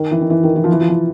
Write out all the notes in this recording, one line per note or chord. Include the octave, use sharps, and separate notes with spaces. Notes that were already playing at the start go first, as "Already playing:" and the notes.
Already playing: D#3
E3
D#3
E3
D#3
E3
F3
E3
F3
E3